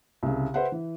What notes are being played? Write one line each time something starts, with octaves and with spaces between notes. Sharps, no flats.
C2 C#3
B4 C5 E5 F#5
E3